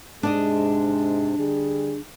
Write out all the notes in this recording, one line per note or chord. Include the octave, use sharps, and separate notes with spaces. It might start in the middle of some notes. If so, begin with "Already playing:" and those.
G#2 C3 G#3 D4 D5 D#5
D3 G3 G#4